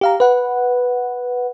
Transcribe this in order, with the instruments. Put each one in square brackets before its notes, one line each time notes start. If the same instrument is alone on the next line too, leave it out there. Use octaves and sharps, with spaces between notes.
[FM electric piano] G4 F5 A#5
B4 F#5